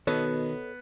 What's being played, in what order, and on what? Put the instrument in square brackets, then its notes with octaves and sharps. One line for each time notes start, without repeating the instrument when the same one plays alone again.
[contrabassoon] B2 [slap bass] D#3 [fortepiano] B3 [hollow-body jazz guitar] A4 C#5 D#5